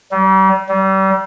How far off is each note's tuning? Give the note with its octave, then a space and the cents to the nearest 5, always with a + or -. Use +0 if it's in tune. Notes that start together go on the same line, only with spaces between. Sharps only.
G3 -40
G3 -35